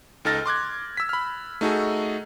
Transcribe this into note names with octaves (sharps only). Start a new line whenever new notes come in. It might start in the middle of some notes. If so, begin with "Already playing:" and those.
C#2 D#4 A4 F6 A6 A#6
C6 D6 F#6 G#6
E6 B6
B5 F6
A3 D#4 F#4 G#4 A4